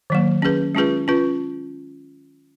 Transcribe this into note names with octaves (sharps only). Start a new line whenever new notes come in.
D#3 F#3 A#3
C#4 G#4 B4
G#3 C#4 F4 G#4 B4
C#4 F4 B4